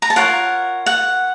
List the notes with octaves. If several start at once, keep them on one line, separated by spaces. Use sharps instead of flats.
A#5
A5
F4 A#4 C#5 F#5
F#5